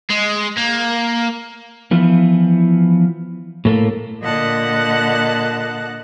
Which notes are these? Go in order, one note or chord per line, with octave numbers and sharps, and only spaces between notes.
G#3
A#3
E3 F3 B3
A2 A3 A#3
A#2 D3 D#5 F#5 A5 F#6